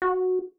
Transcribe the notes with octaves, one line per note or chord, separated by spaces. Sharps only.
F#4